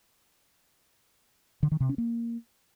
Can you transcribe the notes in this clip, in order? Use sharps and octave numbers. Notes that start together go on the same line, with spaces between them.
D3
D#3
C3
C#4
A#3